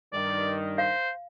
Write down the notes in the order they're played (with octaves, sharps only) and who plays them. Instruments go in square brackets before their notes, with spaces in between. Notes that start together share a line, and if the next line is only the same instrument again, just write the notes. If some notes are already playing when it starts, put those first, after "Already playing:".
[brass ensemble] G2 D#3 [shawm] D5
[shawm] C5 [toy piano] F5